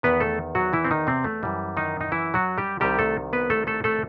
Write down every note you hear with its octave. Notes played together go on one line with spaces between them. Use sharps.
E2 D#3 B3 B4
A3 A4
F#3 F#4
E3 E4
C4
D#3 D#4
C3 C4
A3
F#2 E3 G3
D#3 D#4
D#4
E3 E4
F#3 F#4
G3 G4
C2 C3 D#3 G3 G4
A3 A4
B3 B4
A3 A4
A3 A4
A3 A4